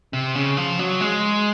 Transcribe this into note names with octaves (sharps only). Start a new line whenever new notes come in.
C3
C#3
F3
F#3
G#3